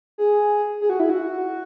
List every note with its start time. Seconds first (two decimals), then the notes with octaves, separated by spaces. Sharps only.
0.18 G#4
0.81 G#4
0.90 F#4
1.00 E4
1.10 F#4